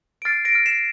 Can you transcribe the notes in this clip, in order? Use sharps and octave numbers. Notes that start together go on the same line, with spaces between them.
D7
F6 A6 C7
A#6 D7
F6
C7 E7